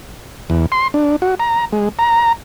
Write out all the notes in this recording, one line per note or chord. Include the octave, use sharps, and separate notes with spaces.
E2
C6
D4
F#4
A#5
G#3
A#5